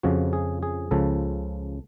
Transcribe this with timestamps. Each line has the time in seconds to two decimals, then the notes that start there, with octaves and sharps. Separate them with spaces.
0.03 F2 C#3 F3 F#4
0.33 G#4
0.63 G#4
0.91 C#2 C#3 F3 A4